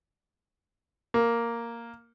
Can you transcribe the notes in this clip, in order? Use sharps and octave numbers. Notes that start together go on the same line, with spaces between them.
A#3